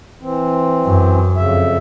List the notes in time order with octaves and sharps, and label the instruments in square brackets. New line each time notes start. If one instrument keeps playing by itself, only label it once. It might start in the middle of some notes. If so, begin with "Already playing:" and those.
[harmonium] E3 C4
[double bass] F#2
[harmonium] F2 C#3 E5